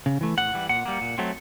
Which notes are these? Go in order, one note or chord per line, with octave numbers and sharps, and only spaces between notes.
C#3
E3 A3
A2 F#5
E3 G3
A#2 F#5
G3 A#3
A#2
F#3 A3 C4